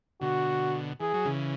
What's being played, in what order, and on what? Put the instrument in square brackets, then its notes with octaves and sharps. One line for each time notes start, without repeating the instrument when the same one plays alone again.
[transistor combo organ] B2 D3 [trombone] F#4
[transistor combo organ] E3 [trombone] G#4
[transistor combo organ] F#3
C#3 E3